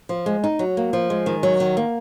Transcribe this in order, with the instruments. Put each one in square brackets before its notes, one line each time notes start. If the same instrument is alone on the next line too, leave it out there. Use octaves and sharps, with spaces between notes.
[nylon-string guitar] F3
G#3
D#4
F#3
A#3
F3
G#3
D#3
F#3
D#3
A#3